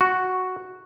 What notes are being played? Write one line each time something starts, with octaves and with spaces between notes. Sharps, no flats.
F#4